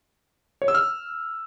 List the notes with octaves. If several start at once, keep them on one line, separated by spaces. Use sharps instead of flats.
C#5
E6
F6